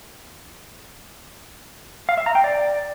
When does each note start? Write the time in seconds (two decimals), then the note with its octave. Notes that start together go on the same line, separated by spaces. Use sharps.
2.09 F5
2.17 E5
2.26 A#5
2.35 G5
2.44 D5